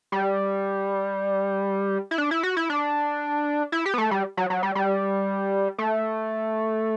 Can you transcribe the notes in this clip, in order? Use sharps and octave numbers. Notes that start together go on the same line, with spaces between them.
G3
E4
D4
E4
F#4
E4
D4
E4
G4
B3
A3
G3
F#3
F#3
G3
G3
A3